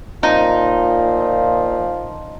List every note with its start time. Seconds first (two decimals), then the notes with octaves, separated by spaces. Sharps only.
0.23 A#2 F3 D#4